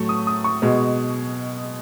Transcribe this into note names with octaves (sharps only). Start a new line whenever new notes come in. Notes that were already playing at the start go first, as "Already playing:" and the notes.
Already playing: A2 F#3 A3 C#6
D#6
D#6
C#6
B2 G#3